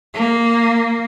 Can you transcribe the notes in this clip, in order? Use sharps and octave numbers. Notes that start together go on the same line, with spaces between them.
A#3